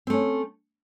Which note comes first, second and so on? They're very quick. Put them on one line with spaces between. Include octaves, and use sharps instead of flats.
C4 A3 C#4